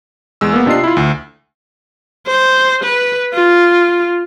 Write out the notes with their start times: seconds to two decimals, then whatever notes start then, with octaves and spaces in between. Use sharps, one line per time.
0.41 E2 G#3 E6
0.53 A#3 B3
0.66 C3 D4 F4 D#5 C7
0.84 E4 F4
0.97 D2
2.27 C5
2.84 B4
3.34 F4